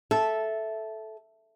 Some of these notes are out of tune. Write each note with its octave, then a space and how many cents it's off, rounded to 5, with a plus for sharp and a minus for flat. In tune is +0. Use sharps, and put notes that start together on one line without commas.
A4 -10 E5 +0